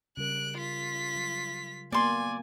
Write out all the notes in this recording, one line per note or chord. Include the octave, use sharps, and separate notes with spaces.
C#3 G3 A#4 F#6 D7
F4 B6
F#3
A#3 B3 F#4 D5 G#5 C6